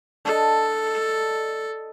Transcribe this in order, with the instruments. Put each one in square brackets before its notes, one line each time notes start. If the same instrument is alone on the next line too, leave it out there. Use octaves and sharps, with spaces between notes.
[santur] D4 D#5 [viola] A4